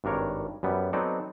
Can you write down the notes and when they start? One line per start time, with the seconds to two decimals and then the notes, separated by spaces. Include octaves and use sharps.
0.04 G#1 G2 D4 A#4 C#5
0.63 F#2 G3 B3
0.93 F#3 B3 C4 D#4 A4 D5